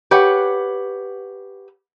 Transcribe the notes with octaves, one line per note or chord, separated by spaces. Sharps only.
G4 B4 C#5 F#5